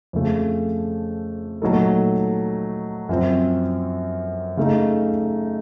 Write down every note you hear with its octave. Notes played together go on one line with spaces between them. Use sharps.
F2 C#3 A3
A#2 F#3 A3 D#4 A4
F#2 F3 C4
C#3 A3 D#4